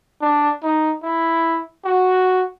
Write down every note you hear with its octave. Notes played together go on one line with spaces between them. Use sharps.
D4
D#4
E4
F#4